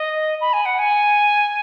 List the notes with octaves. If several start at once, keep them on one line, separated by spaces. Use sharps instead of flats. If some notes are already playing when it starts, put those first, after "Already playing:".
Already playing: D#5
B5
G#5
F#5
G#5